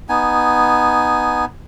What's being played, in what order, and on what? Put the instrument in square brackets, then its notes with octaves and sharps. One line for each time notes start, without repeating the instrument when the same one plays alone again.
[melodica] B3 D#4 G#5